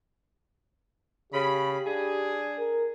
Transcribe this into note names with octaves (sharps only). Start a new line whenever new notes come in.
C#3 G4 B5
D4 G#4
A#4